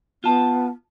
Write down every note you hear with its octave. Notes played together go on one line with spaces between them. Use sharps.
B3 F4 A5